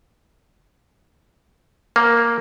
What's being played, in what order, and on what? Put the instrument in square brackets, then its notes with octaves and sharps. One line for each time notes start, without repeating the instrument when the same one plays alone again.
[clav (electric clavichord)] A#3